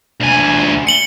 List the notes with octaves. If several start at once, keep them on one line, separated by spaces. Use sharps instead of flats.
D2 G#5
C#7 F#7 G7